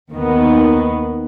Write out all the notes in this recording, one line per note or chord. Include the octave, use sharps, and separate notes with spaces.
D#2 D#3 B3